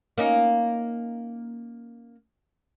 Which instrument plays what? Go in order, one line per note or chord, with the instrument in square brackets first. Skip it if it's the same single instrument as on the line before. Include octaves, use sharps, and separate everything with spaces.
[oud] A#3 C#4 D#4